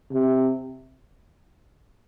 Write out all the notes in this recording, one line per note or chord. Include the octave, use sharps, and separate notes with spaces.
C3